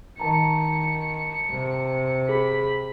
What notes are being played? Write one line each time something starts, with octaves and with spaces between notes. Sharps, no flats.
D#3 A5 A#5 C#7
C3
G#4 B5